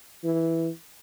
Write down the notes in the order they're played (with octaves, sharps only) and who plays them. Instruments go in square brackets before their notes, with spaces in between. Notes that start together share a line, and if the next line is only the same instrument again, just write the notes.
[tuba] E3